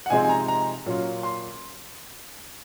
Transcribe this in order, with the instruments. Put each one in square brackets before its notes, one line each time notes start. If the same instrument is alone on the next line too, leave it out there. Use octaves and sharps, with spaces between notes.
[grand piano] F#5
C3 F3 G#3 C4 D#4 G#5
G#5
A#5
A#5
A#2 F#3 C#4 F4
C6